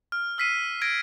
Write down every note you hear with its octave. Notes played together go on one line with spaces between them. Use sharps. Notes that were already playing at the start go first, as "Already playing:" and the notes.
F6
E6 F6 B6 C7 D#7
G#6 A#6 D7